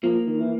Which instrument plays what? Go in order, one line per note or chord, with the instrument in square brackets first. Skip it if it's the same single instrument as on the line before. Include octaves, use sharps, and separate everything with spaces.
[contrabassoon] F3 [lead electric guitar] A#3
[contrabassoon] D#3
E3